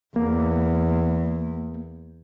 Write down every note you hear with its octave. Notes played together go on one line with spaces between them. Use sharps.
E2 A#3